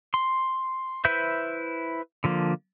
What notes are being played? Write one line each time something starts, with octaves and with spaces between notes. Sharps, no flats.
C6
E4 B4 C5 E5 G6
D3 F3 A#3